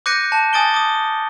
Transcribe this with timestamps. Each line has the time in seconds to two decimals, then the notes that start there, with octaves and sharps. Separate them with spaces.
0.06 D6 F#6 G6 A#6 C#7 D#7
0.32 A5
0.53 G#5 D#6 A6 D7 G7
0.74 D6 D#6